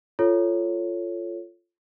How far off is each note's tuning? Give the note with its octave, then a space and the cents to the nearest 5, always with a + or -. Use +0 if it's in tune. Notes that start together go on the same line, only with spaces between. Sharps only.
F4 -10 A4 +0 C#5 +0